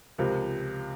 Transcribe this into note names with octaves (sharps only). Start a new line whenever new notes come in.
C#2 C3 F3 A#4